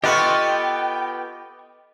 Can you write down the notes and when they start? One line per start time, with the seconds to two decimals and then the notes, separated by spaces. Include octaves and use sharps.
0.04 B3 F4 G4 A4 B4 D#5 G5 C#6